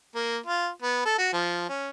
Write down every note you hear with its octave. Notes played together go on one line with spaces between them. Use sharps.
A#3
F4
B3
A4
F#4
F3
C#4